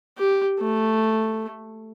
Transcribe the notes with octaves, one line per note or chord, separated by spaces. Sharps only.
G4
A3